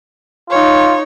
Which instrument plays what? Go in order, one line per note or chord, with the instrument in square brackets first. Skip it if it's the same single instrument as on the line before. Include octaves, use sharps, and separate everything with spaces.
[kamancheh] D#4 C#5 [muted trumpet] F4